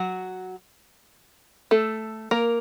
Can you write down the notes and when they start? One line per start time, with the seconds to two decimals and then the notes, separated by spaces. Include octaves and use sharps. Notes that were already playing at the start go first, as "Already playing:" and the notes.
Already playing: F#3 F#4
1.71 A3 A4
2.31 A#3 A#4